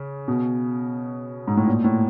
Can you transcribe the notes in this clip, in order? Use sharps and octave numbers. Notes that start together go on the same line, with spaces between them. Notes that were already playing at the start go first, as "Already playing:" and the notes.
Already playing: C#3
B2
G#2
A2
A#2
A2